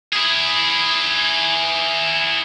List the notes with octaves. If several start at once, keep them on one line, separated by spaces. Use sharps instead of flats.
E4 G#4